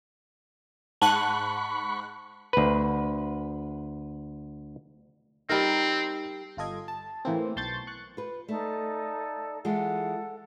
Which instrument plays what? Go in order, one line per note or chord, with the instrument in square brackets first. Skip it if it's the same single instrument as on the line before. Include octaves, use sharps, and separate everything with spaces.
[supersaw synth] G#2 F#5 F#6 [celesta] A5 [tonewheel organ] B5 C#6
[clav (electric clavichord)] D2 B4
[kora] G3 A#4 [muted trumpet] C4 [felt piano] D#4
[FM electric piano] G1 F4 A4 D#5 G#6
A5
A2 E3 A#3 C4
B1 A5 C6 C#6 G6 A6
C#6 F#6
[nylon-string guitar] F4 B4
[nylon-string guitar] A3 [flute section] D#4 A4 D5
[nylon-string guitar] E3 G#3 F4 [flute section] A4 F#5